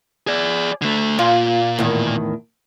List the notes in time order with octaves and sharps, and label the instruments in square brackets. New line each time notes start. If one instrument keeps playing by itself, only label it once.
[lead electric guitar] G#4 D5
D3 A3
[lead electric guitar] A#2 [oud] F4
[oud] E2 A2 D#3